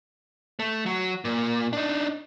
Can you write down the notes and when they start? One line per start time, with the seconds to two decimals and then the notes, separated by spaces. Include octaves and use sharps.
0.59 A3
0.86 F#3
1.25 A#2
1.73 D4 D#4